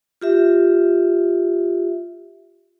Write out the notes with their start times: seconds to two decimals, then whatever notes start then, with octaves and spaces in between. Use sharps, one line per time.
0.21 F4 G4 E5